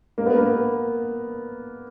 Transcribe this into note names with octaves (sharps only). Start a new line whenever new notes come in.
A#3
B3
A#3